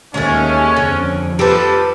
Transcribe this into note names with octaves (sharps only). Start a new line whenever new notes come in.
D#2 G#3 A3 C#4
F2 D3
F3 G3 G4 A4 B4 A5